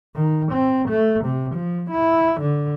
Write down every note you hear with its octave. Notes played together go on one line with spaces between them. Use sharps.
D#3
C4
A3
C3
F3
E4
D3